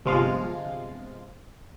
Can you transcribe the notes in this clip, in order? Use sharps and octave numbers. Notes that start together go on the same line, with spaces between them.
G1 C3 F3 G#3 F4 F5